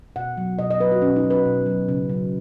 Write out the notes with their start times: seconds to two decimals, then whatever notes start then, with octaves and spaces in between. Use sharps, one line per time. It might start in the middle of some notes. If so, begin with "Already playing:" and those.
0.16 B2 F#5
0.37 F#3
0.59 B2 D#5
0.70 D#5
0.80 F#3 B4
0.92 F#4
1.02 B2 C#4
1.16 D#4
1.24 F#3
1.30 B4
1.46 B2
1.66 F#3
1.88 C#3
2.09 F#3